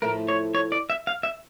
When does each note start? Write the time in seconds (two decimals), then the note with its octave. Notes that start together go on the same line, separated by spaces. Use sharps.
0.02 A2 F3 A3 A#4
0.28 C#5
0.55 C#5
0.72 D5
0.90 E5
1.07 F5
1.23 E5